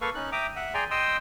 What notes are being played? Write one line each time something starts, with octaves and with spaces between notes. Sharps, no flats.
A#3 A4 B4 F5 C#6
C#4 D#4 F#6
E5 G5 A#5 D6 D#6
E5 F#5
G#4 D5 G5 G#5 A#5 C6
D#5 G5 C6 D#6 E6